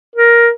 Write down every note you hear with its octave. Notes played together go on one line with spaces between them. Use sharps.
A#4